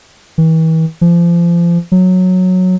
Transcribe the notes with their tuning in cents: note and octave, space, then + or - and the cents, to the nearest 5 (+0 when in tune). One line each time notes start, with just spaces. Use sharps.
E3 -40
F3 -30
F#3 -10